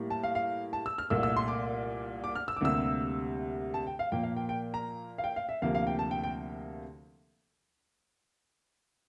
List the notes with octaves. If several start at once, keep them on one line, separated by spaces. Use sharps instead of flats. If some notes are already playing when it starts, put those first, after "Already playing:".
Already playing: A2 G3 A#3
A5
F5
F5
A5
E6
F6
C2 A#2 A3 E6
E6
C6
D6
D6
F6
E6
D6
D2 C3 G3 A#3 E6
A5
G5
F5
A#2 F3 A#3 G5
F5
G5
G5
A#5
F5
G5
F5
E5
D2 C3 F3 A#3 F5
F5
G5
A5
G5
G5